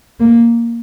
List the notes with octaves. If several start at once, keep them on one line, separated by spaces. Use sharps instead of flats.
A#3